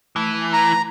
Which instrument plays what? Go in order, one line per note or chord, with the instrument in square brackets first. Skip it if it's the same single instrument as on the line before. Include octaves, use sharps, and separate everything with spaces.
[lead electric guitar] E3 [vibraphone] A3
[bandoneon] A#5